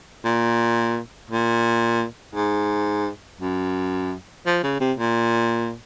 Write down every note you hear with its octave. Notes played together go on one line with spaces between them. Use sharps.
A#2
A#2
G#2
F#2
F3
C#3
C3
A#2